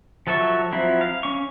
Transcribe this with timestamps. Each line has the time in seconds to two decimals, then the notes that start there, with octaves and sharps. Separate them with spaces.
0.27 F3 F#3 A4 E5 C#6
0.72 F3 F#3 C4 E4
1.01 F5
1.23 C#4 C#6